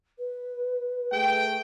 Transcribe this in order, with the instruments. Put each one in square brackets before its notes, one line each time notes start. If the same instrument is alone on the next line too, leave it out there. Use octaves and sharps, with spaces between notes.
[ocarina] B4
[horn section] A3 G#4 G5